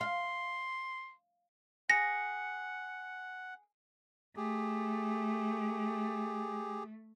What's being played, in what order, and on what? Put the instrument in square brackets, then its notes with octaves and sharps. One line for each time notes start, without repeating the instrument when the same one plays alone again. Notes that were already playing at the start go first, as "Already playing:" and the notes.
[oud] F5 [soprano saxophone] C6
[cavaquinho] G#4 [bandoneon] F#5 [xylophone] A#6 [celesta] C#7
[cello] A3 [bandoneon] G4 G#4